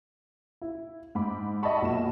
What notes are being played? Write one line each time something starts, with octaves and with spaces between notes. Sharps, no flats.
E4
G#2 B5 D6
D#5 E5 F#5 A5 B5 C#6
B1 A#2 E7